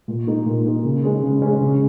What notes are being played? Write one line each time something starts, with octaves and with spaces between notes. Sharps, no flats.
A#2
A#3 D#4
A#2
A#3 D#4
C#3
G#3 C#4
C#3
G#3 C#4
C#3